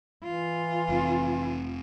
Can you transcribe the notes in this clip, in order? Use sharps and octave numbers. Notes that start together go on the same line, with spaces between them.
E3 F4
F1 C4